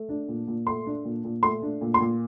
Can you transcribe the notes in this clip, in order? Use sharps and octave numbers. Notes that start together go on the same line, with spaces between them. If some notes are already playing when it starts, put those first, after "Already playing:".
Already playing: A3
D4
A#2
A#2
A3 C6
D4
A#2
A#2
A3 C6
D4
A#2
C6
A#2